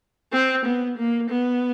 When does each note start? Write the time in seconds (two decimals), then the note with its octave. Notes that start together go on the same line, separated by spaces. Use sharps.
0.32 C4
0.65 B3
0.98 A#3
1.30 B3